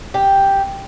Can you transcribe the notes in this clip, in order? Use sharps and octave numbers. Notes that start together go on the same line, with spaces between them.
G4